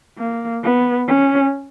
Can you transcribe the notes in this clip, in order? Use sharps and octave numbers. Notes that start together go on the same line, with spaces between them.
A#3
B3
C#4